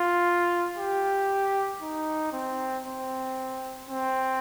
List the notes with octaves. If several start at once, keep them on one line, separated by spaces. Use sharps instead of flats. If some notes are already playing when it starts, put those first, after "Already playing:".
Already playing: F4
G4
D#4
C4
C4
C4